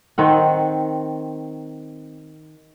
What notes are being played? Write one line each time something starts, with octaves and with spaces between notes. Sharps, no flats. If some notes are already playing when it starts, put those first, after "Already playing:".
D#3 C4 F#5